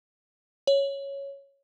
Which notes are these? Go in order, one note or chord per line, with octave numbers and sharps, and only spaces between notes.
C#5